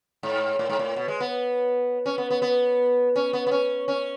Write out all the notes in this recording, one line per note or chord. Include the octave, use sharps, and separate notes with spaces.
G#2
A2
G#2
A2
B2
G#3
B3
C#4
B3
B3
B3
C#4
B3
B3
C#4
C#4